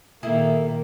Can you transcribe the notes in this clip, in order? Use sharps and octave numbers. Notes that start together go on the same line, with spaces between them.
A#2 D#3 A#3 E4 G#4 A4